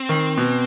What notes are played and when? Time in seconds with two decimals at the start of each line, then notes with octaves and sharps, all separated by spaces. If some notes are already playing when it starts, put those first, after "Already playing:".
Already playing: C4
0.09 D#3
0.38 B2